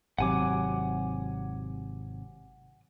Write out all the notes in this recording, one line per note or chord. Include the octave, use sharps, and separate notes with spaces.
G#1 C3 F#3 F#5 G#5 D6